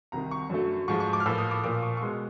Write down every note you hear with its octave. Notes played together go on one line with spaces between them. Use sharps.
C2 C3 D#3 A#5
C#6
F#2 D3 F#3 A3
G#2 F3 G#3 C#6
C#6
D6
F6
A2 F3 A#3 E6
D#6
D6
A#2 F3 A#3 D6
C#6
C#6
B2 G#3 B3 C6